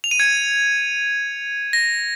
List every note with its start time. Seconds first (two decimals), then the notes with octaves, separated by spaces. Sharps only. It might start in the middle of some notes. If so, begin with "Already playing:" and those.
0.04 F7
0.11 D#7
0.20 G#6 C#7
1.73 A#6